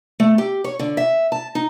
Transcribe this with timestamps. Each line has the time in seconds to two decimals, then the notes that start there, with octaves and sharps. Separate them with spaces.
0.20 A3
0.38 G4
0.64 C#5
0.79 D3
0.97 E5
1.32 A5
1.55 D#4